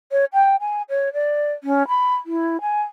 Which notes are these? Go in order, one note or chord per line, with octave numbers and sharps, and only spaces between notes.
C#5
G5
G#5
C#5
D5
C#4
B5
E4
G#5